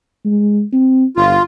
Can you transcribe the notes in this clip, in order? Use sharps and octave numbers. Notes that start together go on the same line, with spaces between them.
G#3
C4
G1 F4